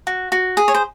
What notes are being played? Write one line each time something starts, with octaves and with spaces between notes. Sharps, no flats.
F#4
F#4
G#4
C#5
C5